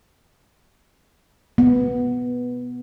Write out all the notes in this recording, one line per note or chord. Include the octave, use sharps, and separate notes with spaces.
B3